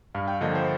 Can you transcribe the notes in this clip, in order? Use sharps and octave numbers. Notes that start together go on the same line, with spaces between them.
G2 F5
G5
D3 F3 A#3 D#5
C5